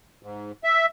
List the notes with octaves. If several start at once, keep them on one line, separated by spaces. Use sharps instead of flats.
G#2
E5